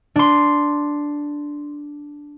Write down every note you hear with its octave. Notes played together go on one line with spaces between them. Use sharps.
D4 C6